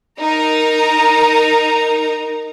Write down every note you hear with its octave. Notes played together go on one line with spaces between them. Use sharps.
D#4 A#4 A#5